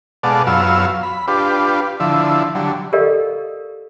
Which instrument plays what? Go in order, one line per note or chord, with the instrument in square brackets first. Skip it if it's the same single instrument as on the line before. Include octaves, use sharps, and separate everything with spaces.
[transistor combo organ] B2 G#3 A4 D5 F5 F#5
F#2 F#3 B3 F4 F5 E6
B5
D4 F4 G4 B4
D3 F3 E4
D3 F#3 G3
[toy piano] G4 A4 A#4 D5 D#5 F5